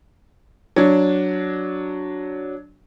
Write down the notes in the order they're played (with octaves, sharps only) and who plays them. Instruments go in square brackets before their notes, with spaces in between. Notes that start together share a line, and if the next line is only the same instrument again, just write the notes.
[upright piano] F#3 D4